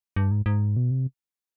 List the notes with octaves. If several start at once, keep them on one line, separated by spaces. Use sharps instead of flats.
G2
G#2
G#2
B2
C3